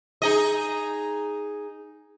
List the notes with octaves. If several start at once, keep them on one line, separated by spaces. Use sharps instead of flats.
D#4 G#4 D#5